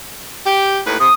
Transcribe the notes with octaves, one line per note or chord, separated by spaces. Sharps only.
G4
D#2 A2 B4
C3 D#6